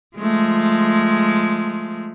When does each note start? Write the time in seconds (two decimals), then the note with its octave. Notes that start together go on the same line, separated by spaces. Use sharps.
0.17 F3 G#3 A3